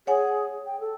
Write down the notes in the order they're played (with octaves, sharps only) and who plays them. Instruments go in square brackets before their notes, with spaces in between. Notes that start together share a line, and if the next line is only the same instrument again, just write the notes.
[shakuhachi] G#4 [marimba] C#5 F#5 G#5
[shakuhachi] G5
A4